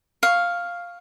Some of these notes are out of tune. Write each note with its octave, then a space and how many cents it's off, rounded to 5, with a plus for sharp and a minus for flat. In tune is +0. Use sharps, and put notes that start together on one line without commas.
F5 +0 C#6 +0